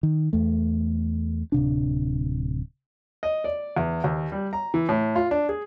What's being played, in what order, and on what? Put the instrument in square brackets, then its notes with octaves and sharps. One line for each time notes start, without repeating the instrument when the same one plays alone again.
[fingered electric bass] D#3
E2 A3
D1 C3 D4
[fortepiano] D#5
D5
E2
D#2
G3
A#5
E3
A2
F4
D4
G#4